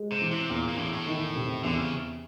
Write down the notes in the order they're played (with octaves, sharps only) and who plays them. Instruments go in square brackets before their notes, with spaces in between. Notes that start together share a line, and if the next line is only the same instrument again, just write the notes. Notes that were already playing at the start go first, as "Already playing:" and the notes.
Already playing: [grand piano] G#3
[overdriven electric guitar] C3
[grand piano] E3
[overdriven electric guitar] C3
[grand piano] E2 [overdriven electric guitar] A#2
[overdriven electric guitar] A#2
[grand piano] E2 [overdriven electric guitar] A2
[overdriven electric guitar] A2
[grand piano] D#3
C3
[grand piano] E2 [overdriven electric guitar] D3
[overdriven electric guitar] C#3